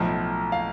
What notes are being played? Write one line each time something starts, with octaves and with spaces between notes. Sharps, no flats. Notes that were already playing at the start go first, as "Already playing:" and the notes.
Already playing: B1 A2 F3
F5